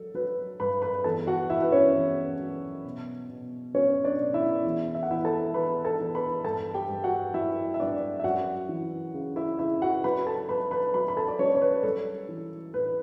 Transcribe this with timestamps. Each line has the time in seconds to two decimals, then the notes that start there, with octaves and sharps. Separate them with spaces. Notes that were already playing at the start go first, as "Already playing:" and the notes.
Already playing: F#3 A4
0.14 F#3 B4
0.60 G2 B4 B5
0.82 B4 B5
1.04 E2 A4 A5
1.27 F#4 F#5
1.50 E2 E4 E5
1.62 B4
1.72 C#4 C#5
1.94 E2
2.39 F#3
2.85 B2
3.30 B2
3.74 F#3 C#4 C#5
4.04 D4 D5
4.19 B2
4.34 E4 E5
4.65 E2
4.95 E5
5.03 F#5
5.10 E2 E4 E5
5.24 A4 A5
5.54 E2 B4 B5
5.85 A4 A5
5.99 E2
6.14 B4 B5
6.44 G2 A4 A5
6.74 G4 G5
6.89 G2
7.04 F#4 F#5
7.34 F#3 E4 E5
7.74 E5
7.80 G2 D4 D5
8.20 E5
8.24 F#2 F#4 F#5
8.69 E3
9.14 C#3
9.36 E4 E5
9.59 C#3 E4 E5
9.82 F#4 F#5
10.04 F#3 B4 B5
10.26 A4 A5
10.49 F#3 B4 B5
10.71 B4 B5
10.94 F#3 B4 B5
11.08 B5
11.17 A4 A5
11.28 D5
11.39 F#3 C#4 C#5
11.55 C#5
11.62 B4
11.83 G3 A4
12.29 E3
12.74 A2 B4